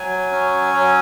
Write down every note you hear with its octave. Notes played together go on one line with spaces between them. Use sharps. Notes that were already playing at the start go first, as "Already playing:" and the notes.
Already playing: F#3 G#5
C#4
F#3